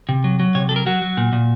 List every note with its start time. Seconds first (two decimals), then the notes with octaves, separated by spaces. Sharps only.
0.09 C3
0.24 F#3
0.40 F#3
0.55 C3 C#5
0.69 F#3 A4
0.76 A#4
0.86 F#3 F#4
1.02 F#3
1.17 A#2
1.33 A#2